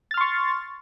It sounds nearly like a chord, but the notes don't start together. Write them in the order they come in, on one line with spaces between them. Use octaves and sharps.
A6 F6 C6 C#6